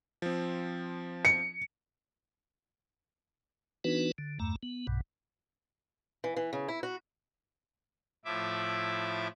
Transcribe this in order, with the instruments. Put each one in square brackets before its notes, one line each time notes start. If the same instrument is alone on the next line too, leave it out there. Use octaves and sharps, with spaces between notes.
[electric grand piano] F3 C4
[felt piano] C#7
[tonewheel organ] E3 B3 D4 D#4 F#4 B4
D3
E2 G2 A3 A#5
B3
B1 G2 B2
[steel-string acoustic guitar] E3
E3
C#3
E4
F#4
[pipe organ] A2 F3 E4 E5 D6